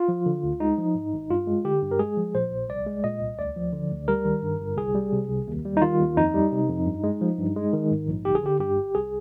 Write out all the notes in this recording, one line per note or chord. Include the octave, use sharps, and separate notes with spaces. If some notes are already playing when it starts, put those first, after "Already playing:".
Already playing: F4
F3
D3
D2
G#3 D#4
F3
G#2
G#1
G2 F4
G#3
D3 G4
G2
A#4
G#3 G#4
F3
A#2 C5
A#1
C2 D5
G#3
A#2 D#5
C2
D2 D5
F3
D3
D2
G3 A#4
D#3
G2
G1
C2 G#4
G3
C3
C2
D#2
G3
D#4
D#3 F4
D#2
F2 D#4
G3
C3
F2
G2
G#3
F3
G2
G#3
D#3
G#2
A#1
G1 G4
G#4
D3 G4
G2 G4
G1
C2 G#4